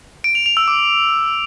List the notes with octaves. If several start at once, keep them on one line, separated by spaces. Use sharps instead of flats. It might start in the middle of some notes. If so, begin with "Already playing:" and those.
D7
F7
F7
E6
D6